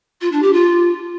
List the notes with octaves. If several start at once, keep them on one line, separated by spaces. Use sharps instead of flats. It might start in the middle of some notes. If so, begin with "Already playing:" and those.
F4
D4
G4
F4